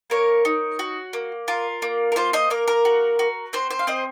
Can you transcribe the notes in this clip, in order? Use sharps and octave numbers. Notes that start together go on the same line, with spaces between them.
A#3 A#4 C#5
D#4
F#4
A#3
F4 A#4
A#3
A#4
F4 C5
C5 D#5
A#3 A#4
A#4
F#4
F#4
C4 C5
C5
F5
C4 C5 D#5